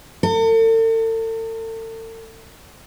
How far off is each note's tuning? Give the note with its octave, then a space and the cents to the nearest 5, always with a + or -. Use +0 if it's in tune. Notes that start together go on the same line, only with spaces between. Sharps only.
A4 +40